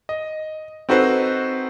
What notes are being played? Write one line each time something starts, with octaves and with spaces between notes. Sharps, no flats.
D#5
C4 D#4 F#4 A4 B4 C5